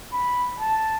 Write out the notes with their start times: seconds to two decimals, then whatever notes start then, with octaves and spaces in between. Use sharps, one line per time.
0.13 B5
0.60 A5